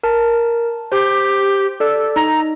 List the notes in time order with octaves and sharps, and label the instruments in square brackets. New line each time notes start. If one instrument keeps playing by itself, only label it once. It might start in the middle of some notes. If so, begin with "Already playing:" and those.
[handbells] A#4 A5
[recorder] G4 [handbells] C5
[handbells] A4 D5 E6
[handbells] D#4 [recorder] A#5